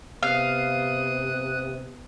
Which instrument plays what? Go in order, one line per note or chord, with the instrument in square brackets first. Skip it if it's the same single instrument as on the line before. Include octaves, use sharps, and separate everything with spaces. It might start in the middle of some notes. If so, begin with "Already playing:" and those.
[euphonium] C3 [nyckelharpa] B3 D#6 [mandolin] F5 [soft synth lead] F#6